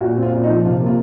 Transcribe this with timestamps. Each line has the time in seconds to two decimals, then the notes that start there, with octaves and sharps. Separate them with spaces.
0.01 A#2 F#4
0.17 C4
0.22 F4
0.32 A#2
0.44 D#4
0.49 F3
0.65 C3 F4
0.81 A#3
0.86 F4